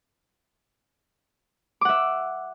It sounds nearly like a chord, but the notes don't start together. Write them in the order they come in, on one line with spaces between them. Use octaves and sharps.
D6 F#5 E5